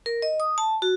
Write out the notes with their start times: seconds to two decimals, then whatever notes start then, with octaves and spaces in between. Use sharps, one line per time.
0.06 A#4
0.22 D#5
0.40 D#6
0.58 A5
0.82 F#4